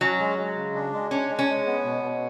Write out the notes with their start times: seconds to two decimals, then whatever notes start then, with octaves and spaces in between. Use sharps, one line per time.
0.01 F#3 C#4
0.19 G#3
0.38 G#3
0.56 C#3
0.75 D4
0.93 G#3
1.11 C#4 D4
1.30 G#3
1.39 C#4
1.49 G#3
1.66 B3
1.85 B2
2.03 B2